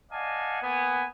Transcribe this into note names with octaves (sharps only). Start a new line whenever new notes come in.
D5 D#5 F5 F#5 G#5 A5
A#3 B3 G#5